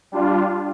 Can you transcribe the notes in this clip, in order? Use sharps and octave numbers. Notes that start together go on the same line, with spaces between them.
G3 D4 F4